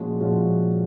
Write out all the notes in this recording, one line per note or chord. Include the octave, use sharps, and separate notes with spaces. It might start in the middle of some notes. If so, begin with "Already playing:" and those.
Already playing: A#2 F3 G#3 C#4 F#4
A#2 F3 G#3 C#4 F#4